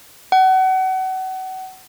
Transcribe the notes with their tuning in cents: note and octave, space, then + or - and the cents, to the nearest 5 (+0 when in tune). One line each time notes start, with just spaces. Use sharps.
F#5 +30